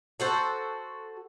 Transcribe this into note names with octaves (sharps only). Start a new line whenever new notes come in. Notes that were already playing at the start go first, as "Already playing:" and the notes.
F#4 A4 C5